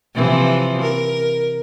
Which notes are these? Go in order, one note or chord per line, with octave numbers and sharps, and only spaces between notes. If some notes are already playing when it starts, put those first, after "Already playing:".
C3 E3 F3
A#4